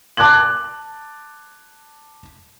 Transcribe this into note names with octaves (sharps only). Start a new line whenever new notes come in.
A5 D6 F#6 G#6 F#7